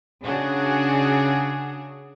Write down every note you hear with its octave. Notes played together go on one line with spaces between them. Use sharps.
C#3 D4 F#4 G#4